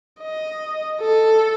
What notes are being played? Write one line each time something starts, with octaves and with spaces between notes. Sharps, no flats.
D#5
A4